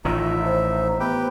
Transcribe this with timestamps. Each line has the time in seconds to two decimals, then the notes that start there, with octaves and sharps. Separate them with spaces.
0.05 A1 A2 D#3 D#4 F4 E5
0.45 C5
1.00 B3 G4 B4 G5